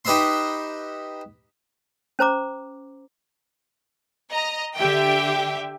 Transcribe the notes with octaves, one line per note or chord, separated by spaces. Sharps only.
D#4 G4 B4 D#5 E5 C6
C#4 C5 A#5 D6
D#5 A#5
D3 G4 E5 G5